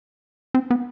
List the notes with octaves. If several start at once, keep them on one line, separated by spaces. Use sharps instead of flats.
C4
B3